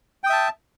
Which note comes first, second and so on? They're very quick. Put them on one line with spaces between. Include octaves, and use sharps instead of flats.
G5 D#6 E5 A5